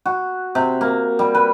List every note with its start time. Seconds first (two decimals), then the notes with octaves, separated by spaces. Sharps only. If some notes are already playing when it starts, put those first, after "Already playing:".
0.06 F#4
0.55 C3
0.81 A#3
1.19 G3
1.35 B4